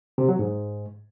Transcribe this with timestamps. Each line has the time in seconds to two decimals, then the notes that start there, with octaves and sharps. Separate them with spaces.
0.18 C3
0.29 F#3
0.39 G#2